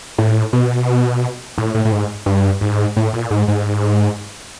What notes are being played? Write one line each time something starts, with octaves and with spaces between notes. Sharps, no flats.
A2
B2
A2
A2
A2
G#2
G2
G#2
A2
A#2
G#2
G#2